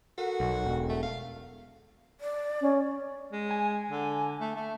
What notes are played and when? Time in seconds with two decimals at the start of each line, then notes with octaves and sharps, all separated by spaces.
0.18 F#4 A4 A#4 F#5
0.40 B1
0.64 E1
0.89 A3
1.03 F5
2.21 D5
2.61 C#4
3.33 G#3
3.51 G#5
3.91 D3
4.41 A3
4.55 A3